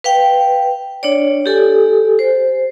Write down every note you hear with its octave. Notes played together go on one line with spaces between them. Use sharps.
B4 F5 G5
D4 C#5 D5
G4 A4 G#5
C5